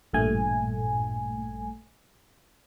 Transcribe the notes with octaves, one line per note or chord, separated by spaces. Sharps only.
A1 G2 A#2 A3 G#5